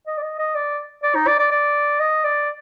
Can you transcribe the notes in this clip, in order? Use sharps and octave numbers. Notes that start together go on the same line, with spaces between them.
D#5
D5
D#5
D#5
D5
D5
D#4
D5
D5
D5
D#5
D5